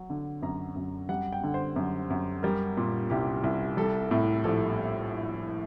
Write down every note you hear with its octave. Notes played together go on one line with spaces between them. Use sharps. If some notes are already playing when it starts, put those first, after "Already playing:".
Already playing: F#3
D3
F#2 A#5
F#2
G3 F#5
G5
D3
C5
F#2
F#2
G3 A#4
A#2
C2 G4
C2
G3 A4
A2
A#1 A4